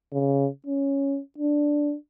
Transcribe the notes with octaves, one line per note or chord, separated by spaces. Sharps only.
C#3
C#4
D4